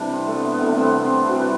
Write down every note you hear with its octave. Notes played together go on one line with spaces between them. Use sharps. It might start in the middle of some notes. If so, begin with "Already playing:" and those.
Already playing: C3 E3 G3 D4 E4 A4
C4
A3
B3
B3
C3 E3 G3 A3
C4
B3
C4
C3 E3 G3 F#4
B4